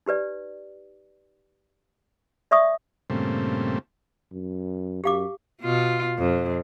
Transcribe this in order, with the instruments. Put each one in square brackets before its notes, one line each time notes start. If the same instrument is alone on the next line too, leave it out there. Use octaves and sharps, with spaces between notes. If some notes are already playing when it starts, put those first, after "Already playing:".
[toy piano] D#4 G4 B4 D5
D5 E5 C#6 D#6
[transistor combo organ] G2 A#2 C#3 A3 C4
[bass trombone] F#2
[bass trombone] F#2 [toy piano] G4 F5 D6
[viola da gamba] B2 F4
F2